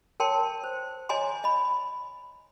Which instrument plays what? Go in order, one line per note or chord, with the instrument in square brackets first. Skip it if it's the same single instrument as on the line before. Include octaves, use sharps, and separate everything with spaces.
[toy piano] A#4 C#5 G5 A5 C6
C5
C#5 D#5 G#5 A#5 C6
D#5 B5